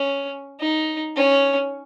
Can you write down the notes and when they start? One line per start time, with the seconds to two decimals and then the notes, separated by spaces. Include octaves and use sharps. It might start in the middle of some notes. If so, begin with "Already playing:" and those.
Already playing: C#4
0.60 D#4
1.16 C#4